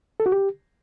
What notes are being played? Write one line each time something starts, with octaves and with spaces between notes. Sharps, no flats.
A4
F#4
G4